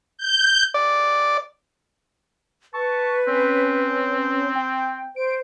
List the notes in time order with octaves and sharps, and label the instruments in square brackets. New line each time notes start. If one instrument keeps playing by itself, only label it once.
[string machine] G6
[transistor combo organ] D5
[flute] B4 [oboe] A5 [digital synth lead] C#6
[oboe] C4 [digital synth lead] C#4
[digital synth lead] G5
[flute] C5 [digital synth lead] D7